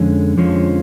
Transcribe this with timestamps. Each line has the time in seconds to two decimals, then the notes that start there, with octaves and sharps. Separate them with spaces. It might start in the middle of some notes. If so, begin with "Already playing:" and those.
Already playing: F2 D3 G#3 C#4
0.37 F2 D3 F3 G#3 C#4